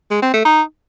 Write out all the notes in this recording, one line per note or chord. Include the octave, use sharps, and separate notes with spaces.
G#3
C4
A3
D#4